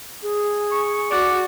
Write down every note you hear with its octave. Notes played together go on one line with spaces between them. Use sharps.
G#4
C#6
F#4 D5